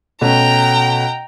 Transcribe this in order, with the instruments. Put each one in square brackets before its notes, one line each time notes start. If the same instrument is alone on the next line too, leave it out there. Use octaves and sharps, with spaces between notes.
[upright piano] B2 A3 C#4 [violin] G5 A#5